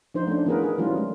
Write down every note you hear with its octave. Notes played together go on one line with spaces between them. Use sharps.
F3 D4 D#4 C5
A3 C#4 D4
E3 B3 F4 G#4 A#4 B4
D#4 G#4 A#4
E3 F#3 G3 A3 C#4 F4
G#3 A3